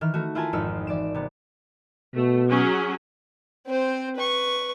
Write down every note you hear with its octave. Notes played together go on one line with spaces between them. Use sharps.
D#3 E3 F6
A3 F#4
E4 F4 A#4 G#5 A5
G#1 F2 D#4 E6 F6 C#7
E3 D5 D7 E7
C3 B3
B2 A3
F#3 C#4 G#4
C4 C5
B4 C#6